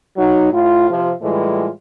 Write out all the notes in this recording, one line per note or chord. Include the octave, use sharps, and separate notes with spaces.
F#3 D#4
A2 F4
C3 F3
A2 E3 G3 G#3 F4